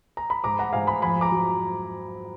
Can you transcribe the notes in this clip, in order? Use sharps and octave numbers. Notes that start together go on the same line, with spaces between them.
A#5
B5
G#2 A#5 D6
F#5 A#5
G#2 F5 G#5
G#5 B5
F2 G#5 B5
A#5 D6
F#3